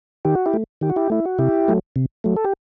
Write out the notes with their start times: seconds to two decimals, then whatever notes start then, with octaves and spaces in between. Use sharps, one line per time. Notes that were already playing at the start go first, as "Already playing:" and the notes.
0.25 D#3 G4
0.35 F#4
0.46 E4 G4
0.54 A3
0.81 D#3 G4
0.90 F#4
0.96 E4 G4
1.10 A3 E4
1.25 F#4
1.38 C3 E4 G4
1.68 F#3 A3
1.96 C3
2.24 F#3 A3
2.36 A4
2.44 G4